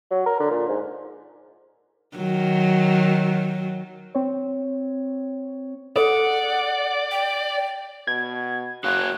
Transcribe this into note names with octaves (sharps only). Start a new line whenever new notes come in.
F#3
A#4
D3
A#2
G#2
D#3 F#3
C4 C#5
G#4 A4 D5 F#5
G5
B2 G#6
F#1 F#4 C#5 F5 F#6